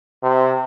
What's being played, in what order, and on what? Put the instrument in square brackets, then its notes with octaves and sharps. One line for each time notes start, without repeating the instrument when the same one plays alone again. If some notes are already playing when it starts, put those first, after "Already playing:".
[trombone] C3